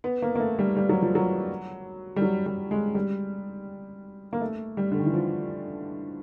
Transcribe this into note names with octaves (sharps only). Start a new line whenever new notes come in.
B3
A#3
A#3
A3
G3
G3
F#3
F3
F#3
G3
F#3
G3
G#3
G3
A#3
A3
G3
D3
D#3
E3
F3